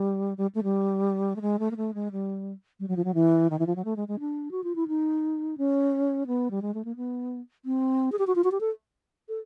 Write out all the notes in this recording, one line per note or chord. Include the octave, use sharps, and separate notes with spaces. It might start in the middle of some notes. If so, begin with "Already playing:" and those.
Already playing: G3
G3
A3
G3
A3
G#3
A3
A#3
A3
G#3
G3
G3
F#3
F3
F#3
E3
D#3
E3
F3
F#3
A3
G#3
G#3
D4
F#4
F4
E4
D#4
C#4
B3
G3
G#3
A3
A#3
B3
C4
G#4
G4
F#4
F4
F#4
G4
A4
A4